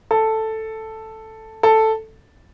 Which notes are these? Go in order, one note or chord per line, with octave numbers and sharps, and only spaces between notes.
A4
A4